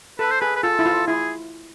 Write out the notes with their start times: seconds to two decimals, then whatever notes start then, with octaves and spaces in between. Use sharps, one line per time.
0.19 A4 B4
0.31 C5
0.41 G#4 B4
0.56 B4
0.63 F4 A4
0.79 E4
0.86 F4
1.07 E4 G#4